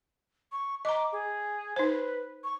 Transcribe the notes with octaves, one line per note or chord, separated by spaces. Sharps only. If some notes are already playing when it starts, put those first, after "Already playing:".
C#6
D#5 A#5 D6
G#4
D#4 B4 C5
C#6